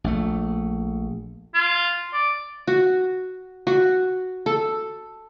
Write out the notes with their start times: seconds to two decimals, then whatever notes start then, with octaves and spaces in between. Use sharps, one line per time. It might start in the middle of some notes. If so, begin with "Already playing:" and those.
0.04 A#1 A3
1.54 F4
2.13 D5
2.67 F#4
3.67 F#4
4.46 A4